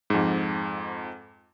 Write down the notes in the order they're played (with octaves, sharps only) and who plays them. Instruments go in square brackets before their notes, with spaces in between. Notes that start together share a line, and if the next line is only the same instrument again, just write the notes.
[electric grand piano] F2 G#2